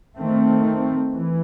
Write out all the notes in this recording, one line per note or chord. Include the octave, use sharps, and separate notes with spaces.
D#3 A3 C4
E3